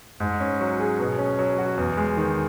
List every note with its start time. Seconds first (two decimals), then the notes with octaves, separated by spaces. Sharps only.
0.20 G#2
0.40 C#4
0.60 F#3
0.79 G#4
0.99 B2
1.19 C#4
1.39 F#3
1.58 F#4
1.77 E2
1.97 G#3
2.17 D#3